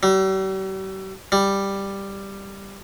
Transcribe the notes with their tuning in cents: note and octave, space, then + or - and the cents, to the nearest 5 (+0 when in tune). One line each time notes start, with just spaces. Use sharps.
G3 -45
G3 +5